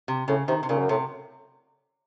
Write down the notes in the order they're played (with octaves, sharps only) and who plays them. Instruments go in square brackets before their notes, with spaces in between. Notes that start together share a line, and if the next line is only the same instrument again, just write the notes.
[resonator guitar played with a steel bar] C3
[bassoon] A2 [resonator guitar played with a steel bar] C#3
[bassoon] C3 [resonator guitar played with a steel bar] D#3
[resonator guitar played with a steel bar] C3
[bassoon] A#2 [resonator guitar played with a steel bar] C#3
[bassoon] F#2
[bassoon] A2 [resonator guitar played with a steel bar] C3